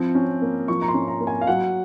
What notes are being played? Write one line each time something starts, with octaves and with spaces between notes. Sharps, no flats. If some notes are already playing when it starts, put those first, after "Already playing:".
Already playing: F3 C4
C#4
A#3
F3 C#6
A#5
C6
C#4
A#5
A#3
G#5
F5
F#3 F#5